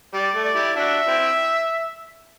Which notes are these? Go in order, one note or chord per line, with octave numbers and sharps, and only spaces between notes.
G3 D5
A3
D5
E4 G4
D4 F#4 E5
C4 E4